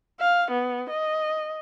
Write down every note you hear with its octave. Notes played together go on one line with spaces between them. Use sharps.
F5
B3
D#5